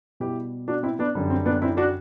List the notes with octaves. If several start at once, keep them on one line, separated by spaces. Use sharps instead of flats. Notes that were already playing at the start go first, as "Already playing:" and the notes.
B2 G3 E4 G4
D4 F#4
C4 E4
B3 D4
F#2 D3 G3
C4
B3 D4
C4 E4
D4 F#4